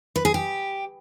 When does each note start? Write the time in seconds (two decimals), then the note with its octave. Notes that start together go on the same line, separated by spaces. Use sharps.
0.16 B4
0.25 G#4
0.34 G4